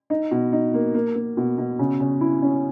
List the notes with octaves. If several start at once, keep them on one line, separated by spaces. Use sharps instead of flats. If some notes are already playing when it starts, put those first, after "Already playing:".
D#4
B2
D#4
A#3
A#3
A#3
B2
B2
C#3
C#3
E4
C#4